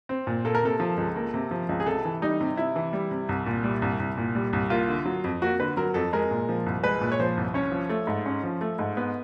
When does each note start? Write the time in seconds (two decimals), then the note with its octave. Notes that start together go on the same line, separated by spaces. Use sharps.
0.09 C4
0.27 A#2
0.45 A#3 A4
0.55 A#4
0.63 C3 A4
0.80 F3
0.97 C#2
1.16 A#3
1.34 C3
1.51 F3
1.69 C#2
1.80 G#4
1.86 C3 A4
2.05 E3
2.22 G3 D#4
2.41 C3
2.57 C3 E4
2.76 E3
2.93 G3
3.11 C3
3.29 C2
3.46 A#2
3.64 G3
3.82 C2
4.00 C2
4.17 A#2
4.35 G3
4.53 C2
4.70 A#3 F4
4.89 D3
5.06 F#3
5.24 F2
5.42 A#3 F#4
5.60 D3 B4
5.77 F#3 A#4
5.94 F2 A4
6.13 G#3 A#4
6.31 A#2
6.49 F3
6.66 C2
6.83 G#3 B4
7.01 A#2
7.12 C#5
7.20 F3 C5
7.37 C2
7.54 C#4 C#5
7.72 F3
7.89 A3
8.07 G#2
8.26 C#4
8.43 F3
8.61 A3
8.79 G#2
8.97 B3